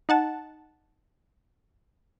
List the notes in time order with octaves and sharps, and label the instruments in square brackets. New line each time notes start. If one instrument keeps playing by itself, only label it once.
[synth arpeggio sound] D#4 F#5 A5